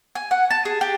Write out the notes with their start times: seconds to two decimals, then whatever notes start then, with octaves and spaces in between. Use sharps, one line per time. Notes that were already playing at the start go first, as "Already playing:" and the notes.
0.15 G#5
0.31 F#5
0.50 A5
0.65 G#4
0.81 G4